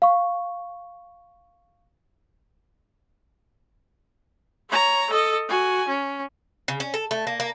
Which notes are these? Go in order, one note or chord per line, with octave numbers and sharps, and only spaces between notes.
F5 C#6
C#5 A#5
A4 D#5
F#4 G#5
C#4
C#3
C#4
A4
A3
A#3
A#3